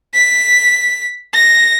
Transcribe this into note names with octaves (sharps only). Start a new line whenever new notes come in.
B6
A#6